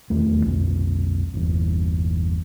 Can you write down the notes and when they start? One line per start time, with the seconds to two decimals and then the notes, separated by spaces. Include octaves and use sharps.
0.10 E1 D#2 A3
0.45 B1 F2
1.34 G1 E2